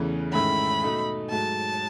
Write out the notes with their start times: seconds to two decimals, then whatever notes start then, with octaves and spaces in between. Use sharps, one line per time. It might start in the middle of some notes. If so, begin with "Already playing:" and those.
Already playing: E2 C#3 E3 A3 C#4
0.33 G#2 D#3 A3 C#4 E4 B5
0.82 B2 A3 D#4 A4
1.31 G#2 F#3 A3 A5